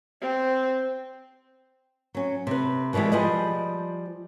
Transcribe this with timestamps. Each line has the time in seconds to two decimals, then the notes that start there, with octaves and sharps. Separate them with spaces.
0.21 C4
2.15 F#3 C#4
2.47 C3 B4
2.93 B2 D#3 E3 G3 G#3
3.12 F3 G3 G#4 B4 D#5